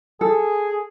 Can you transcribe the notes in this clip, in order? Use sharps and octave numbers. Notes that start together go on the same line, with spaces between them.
G#4 A4